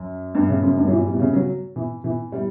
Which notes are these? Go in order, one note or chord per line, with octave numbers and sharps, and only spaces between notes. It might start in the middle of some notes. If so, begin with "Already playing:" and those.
Already playing: F#2
G2
C#3
F#2
G2
F#3
E3
G3
B2
C#3
F#3
E3
E3
G3